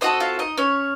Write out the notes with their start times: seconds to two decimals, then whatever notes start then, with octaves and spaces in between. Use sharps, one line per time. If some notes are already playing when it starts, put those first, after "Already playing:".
0.01 C4 F#4 A4 D#5 D#6
0.20 F4 F5
0.39 D#4 D#5
0.58 C#4 C#5